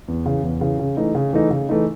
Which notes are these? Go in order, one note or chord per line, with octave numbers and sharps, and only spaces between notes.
E2
C#3 E3
E2
C#3 E3
C#3
E3 A3 D#4
C#3
E3 A3 D#4
C#3
E3 A3 D#4